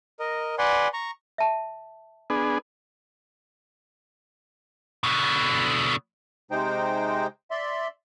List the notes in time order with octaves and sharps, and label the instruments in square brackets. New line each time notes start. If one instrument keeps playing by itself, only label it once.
[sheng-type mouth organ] A#4 D#5
B4 D5 F#5 G#5 C6
A#5 C#6
[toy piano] E5 A5
[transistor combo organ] B3 D4 G#4
[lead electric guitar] B2 D3
[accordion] C3 G#3 D#4 C5 G5
D5 E5 C6